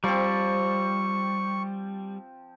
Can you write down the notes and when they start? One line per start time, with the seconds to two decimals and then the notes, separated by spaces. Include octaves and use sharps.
0.04 F3 G3 C4 C#6